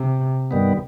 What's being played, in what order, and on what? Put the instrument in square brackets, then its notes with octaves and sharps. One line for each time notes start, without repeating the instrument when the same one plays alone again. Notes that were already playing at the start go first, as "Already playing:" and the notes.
Already playing: [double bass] C3
[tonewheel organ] G2 D#3 G3 B3